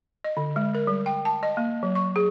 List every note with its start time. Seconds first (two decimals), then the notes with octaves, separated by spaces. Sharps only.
0.24 D#5
0.37 D3
0.56 G#3
0.75 A#4
0.87 G3
1.06 G5
1.25 A5
1.43 D#5
1.57 A#3
1.83 F#3
1.95 C#6
2.16 G#4